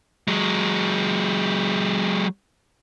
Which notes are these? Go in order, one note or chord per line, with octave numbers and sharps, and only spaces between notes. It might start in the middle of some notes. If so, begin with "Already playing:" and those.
F#3 G#3